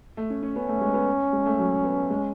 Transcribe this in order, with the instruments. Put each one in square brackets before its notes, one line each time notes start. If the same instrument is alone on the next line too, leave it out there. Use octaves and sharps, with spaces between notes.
[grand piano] A3
C#4
C#4
[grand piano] B3 [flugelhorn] C#4
[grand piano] A3
G#3
B3
G#3
A3
F#3
B3
G#3